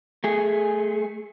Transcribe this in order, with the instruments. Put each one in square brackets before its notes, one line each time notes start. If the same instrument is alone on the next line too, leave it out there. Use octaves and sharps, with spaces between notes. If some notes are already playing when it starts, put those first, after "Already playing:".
[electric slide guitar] A3 G#4